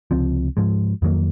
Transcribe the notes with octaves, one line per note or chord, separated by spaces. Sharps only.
C#2 C3 F3 C4
G#2 F3 G#3
F2 D#3 F#3 A#3